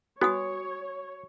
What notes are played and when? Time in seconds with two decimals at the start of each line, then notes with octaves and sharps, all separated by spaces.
0.21 B3 F#4 C#5 G#5 D#6